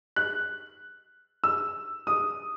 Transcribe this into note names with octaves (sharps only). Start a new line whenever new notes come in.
F#6
E6
D#6